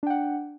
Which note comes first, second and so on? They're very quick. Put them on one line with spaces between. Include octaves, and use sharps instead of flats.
D4 G5 F#5